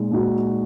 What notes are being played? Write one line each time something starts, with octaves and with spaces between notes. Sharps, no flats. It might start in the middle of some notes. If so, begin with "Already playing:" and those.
Already playing: A#2 G#3 D#4
A#2 G#3 D#4 F#4